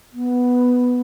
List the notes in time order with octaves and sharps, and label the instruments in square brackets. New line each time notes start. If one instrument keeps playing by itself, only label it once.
[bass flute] B3